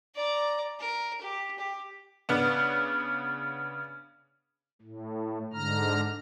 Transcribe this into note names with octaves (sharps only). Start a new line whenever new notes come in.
D5 A#5
A#4
G4
G4
C#3 B3 D4
A2
G#2 D3 A#5 F6